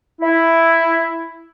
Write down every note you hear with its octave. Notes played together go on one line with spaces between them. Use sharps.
E4